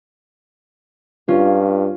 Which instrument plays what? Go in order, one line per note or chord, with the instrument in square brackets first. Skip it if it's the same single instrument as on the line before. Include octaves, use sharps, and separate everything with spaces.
[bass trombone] G2 [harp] C#4 F4